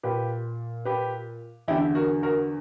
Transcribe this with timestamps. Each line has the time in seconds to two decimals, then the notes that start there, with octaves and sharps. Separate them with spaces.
0.03 A#2 G4 B4
0.85 G4 B4
1.68 E2 D3 E4 G4
1.95 F#4 A#4
2.23 F#4 A#4